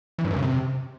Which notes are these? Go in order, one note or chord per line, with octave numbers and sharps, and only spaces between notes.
E3
G2
F#2
C#3
C3